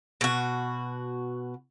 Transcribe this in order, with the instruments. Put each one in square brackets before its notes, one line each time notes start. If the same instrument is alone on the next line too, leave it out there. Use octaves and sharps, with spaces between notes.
[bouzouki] B2 F#4